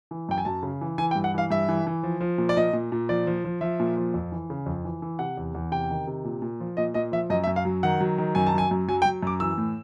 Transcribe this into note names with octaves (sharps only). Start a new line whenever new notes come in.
E3
F#2 G5
G#5
F#2 A5
C#3
E3
E3 G#5
G5
G2
F#5
E3 F5
G2 E5
E3
E3
F3
F3
A#2
D5
A#2 D#5
A#2
A#2
F3 D5
F3
F3
F3 E5
A#2
F3
F2
E3
C#3
F2
E3
E3
C3 F#5
E2
E2
C3 G5
D#3
C3
A#2
A#2
F3
A#2 D#5
A#2 D#5
F3 E5
F#2 D#5
E5
F#2
F5
F#3
D#3 F#5
F#3
D#3
F#2 G#5
A5
F#3 G#5
F#2
F#3 G#5
G5
F#3
F#2 D6
E3 E6
A2